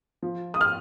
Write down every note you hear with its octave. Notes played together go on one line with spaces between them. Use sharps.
F3
D#6
F6